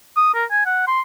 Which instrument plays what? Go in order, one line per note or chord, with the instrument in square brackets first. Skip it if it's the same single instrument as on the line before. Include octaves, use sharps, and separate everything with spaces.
[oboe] D#6
A#4
G#5
F#5
C6